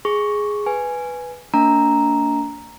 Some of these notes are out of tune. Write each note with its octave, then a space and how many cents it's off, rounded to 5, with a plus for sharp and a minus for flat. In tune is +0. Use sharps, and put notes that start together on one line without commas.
G#4 +0 C#6 +0
B4 +0 G#5 +0
A#3 -45 D4 -35 A#5 +0